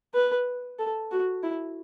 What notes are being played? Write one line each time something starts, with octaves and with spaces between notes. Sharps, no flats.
B4
A4
F#4
E4